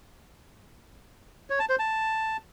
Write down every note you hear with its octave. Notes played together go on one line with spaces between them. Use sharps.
C#5
A5
C5
A5